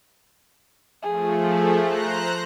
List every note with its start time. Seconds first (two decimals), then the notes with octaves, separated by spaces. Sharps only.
1.02 F3 A3 G#4
1.79 C5 A#5 F#6